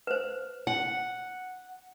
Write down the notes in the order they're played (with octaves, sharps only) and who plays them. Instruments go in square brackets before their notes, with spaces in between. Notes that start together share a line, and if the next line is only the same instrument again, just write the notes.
[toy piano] B4 C5
[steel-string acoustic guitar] F#5